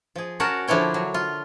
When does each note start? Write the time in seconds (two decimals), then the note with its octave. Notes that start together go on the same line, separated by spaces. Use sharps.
0.15 F3 G#4
0.40 C#4 F#4 A#4 C#5 F#5 A5
0.68 D3 F3 D4 E4 C#5 G5
0.94 F#3
1.14 F4